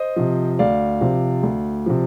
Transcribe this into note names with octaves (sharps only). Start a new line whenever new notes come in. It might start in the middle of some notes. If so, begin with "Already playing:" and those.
Already playing: C5 D#5
C3 F3
D2 D5 F5
C3 F3
D2
C3 F3